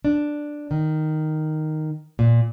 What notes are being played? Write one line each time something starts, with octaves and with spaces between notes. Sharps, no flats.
D4
D#3
A#2